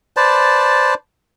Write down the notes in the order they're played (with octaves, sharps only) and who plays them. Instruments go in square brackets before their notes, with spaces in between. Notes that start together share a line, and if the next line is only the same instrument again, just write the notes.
[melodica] B4 C5 D5 A5